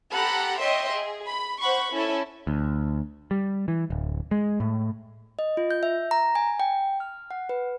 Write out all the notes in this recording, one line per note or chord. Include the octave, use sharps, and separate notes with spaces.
G4 A4 F#5 A#5 B5
C#5 D#5 E5 G5 C6
G#4
B5
C5 F#5 B5 C#6
C#4 E4 A4
D2
G3
E3
D1
G#3
A2
D#5
F4
G6
E5
A#5
G#5
G5
F6
F#5
B4